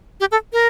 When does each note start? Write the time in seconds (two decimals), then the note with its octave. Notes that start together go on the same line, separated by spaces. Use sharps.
0.20 G4
0.31 A4
0.53 A#4